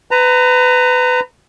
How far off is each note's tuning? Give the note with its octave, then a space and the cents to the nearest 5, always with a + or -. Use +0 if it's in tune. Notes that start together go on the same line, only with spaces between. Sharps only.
B4 +25 A#5 -15